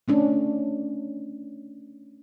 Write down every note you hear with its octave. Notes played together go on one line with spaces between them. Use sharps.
A3 C#4 D4